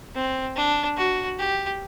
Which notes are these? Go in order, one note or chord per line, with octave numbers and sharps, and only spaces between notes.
C4
D4
F#4
G4